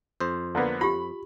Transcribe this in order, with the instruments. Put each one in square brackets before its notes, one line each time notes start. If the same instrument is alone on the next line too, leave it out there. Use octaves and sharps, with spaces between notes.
[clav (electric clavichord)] F2 C5
[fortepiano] D3 A#3 B3
[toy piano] F4 G4 [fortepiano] B5